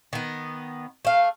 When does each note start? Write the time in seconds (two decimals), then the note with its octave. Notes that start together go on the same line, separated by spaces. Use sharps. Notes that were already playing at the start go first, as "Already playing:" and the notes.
0.13 D#3 B3
1.05 A3 F5